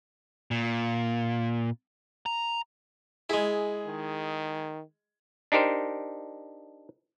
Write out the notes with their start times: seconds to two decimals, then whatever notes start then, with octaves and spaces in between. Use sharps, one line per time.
0.51 A#2
2.26 A#5
3.30 G#3 E4 G#4
3.87 D#3
5.52 D4 D#4 G4 A#4 C5